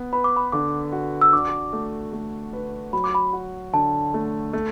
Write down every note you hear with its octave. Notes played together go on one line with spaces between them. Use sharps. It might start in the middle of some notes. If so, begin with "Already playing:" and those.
Already playing: B3
B4 B5
D6
B5
D3 D6
F#4
E6
D4 D6
A3
A3
B4
F#3 B5
D6
B5
F#4
D3 A5
A3
A3